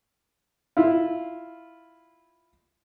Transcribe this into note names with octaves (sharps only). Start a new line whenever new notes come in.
E4 F4